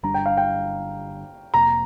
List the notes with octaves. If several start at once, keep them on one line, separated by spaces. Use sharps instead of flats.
G1 G2 G3 D4 A#5
G5
F5
G5
F1 F2 C3 A#3 A#5